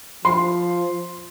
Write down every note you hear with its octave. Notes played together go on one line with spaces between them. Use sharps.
F3 C6